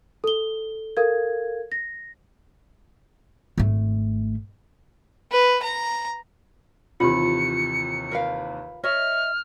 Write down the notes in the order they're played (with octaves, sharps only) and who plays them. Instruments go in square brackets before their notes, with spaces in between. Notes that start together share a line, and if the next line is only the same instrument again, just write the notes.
[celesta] A4 G7
A4 A#4 F5 G#6
A#6
[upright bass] G#1 A3
[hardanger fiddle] B4
A#5
[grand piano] D#2 C3 E3 [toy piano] F4 G4 [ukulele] B5 [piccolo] C#7
[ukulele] A#4 B4 F5
[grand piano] C#5 [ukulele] D#5 E5 [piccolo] F6